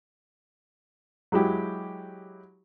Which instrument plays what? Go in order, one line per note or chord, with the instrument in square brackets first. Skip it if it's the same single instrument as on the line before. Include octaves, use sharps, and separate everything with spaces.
[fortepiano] F#3 G#3 E4 G4